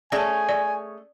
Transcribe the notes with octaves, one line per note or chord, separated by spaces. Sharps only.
A3 C#4 G#4 D5 G#5 A5
D5